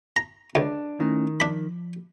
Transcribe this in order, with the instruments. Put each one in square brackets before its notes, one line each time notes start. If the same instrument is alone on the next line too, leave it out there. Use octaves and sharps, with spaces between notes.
[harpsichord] A#5
[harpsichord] C#2 [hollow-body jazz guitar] D4
[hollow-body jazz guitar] D#3 [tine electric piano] A3 C#4 E4
[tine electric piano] F3 [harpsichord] D4 B5